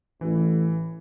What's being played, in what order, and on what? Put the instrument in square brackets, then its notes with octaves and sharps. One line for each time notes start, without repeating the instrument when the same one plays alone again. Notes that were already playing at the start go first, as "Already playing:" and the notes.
[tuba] A1 [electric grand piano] E3